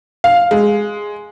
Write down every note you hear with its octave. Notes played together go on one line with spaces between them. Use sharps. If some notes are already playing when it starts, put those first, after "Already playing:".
F5
G#3